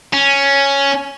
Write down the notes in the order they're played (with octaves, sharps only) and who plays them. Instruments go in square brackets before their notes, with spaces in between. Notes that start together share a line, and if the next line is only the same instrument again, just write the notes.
[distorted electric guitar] C#4